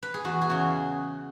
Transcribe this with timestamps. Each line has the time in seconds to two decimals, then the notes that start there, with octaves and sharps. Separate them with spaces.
0.03 B4
0.14 G#4
0.24 E2 F#4
0.41 G#4
0.49 C#3 E3 F#4